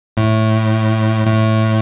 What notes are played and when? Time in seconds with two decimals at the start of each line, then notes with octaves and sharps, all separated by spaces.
0.17 A2
1.27 A2